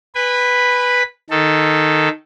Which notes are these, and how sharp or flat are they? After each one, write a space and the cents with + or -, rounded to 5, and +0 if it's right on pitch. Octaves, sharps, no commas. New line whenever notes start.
B4 +0 G#5 -35 B5 +0
D#3 +0 A4 +0